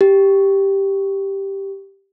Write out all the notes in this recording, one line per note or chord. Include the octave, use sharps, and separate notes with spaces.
G4